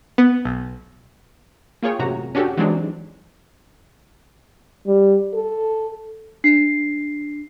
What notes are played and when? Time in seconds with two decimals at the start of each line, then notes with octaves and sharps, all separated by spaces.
0.18 B3
0.45 B1
1.83 A#3 F4 G#4 C#5 G5
1.99 A1 F#2 C3 F#4 A#5
2.35 C#4 D4 F#4 G4 A4
2.57 E3 F#3 G#3 C4 D4 D#4
4.87 G3
5.34 A4
6.44 D4 C7